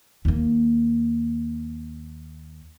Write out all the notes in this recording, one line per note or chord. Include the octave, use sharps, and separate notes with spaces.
D#2 A#3